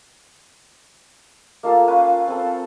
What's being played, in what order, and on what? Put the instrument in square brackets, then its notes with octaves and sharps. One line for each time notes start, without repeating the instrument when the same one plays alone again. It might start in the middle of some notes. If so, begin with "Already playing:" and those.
[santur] A#3 F4 A4 F5
C#4 F4 B4
C4 A4